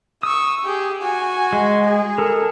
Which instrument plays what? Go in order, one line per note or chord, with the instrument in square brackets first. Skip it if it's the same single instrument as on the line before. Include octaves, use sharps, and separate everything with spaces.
[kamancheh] C#6 E6 [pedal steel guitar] D#6
[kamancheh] G4 G#4
F#4 G#5
[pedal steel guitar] G#3
[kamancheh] G#4
[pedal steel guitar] A4 A#4